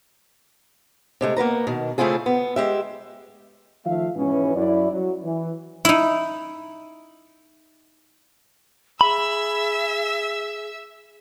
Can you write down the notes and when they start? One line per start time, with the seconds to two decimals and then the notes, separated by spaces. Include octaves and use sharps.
1.21 C3 G#3 A3
1.36 A#3 B3 B4 A#5
1.67 B2 D#3
1.98 C#3 A3 C4 E4 F4 G#4
2.26 B3
2.56 G#3 G4 E5
3.86 D#3 F3 A3 E5 F5
4.16 G#2 B2 E3 C#4
4.56 F#2 E4 D5
4.92 F#3
5.24 E3
5.85 D#4 E4
9.01 G#4 E5 B5 E6